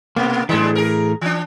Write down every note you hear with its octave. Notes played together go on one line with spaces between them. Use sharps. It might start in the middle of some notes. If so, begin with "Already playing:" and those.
B2 A#3 B3
F#2 A2 E3 G#3 D4
G#4 A#4
E3 D4